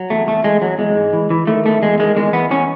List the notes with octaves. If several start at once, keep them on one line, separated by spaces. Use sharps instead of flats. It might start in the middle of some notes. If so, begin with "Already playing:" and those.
Already playing: F#3
E2 A3
E2 A3
E2 G#3
E2 F#3
E2 G#3
G#2
E3
E3
D#3 A3
E2 A3
E2 G#3
D#3 G#3
E2 G#3
E2 B3
E2 C#4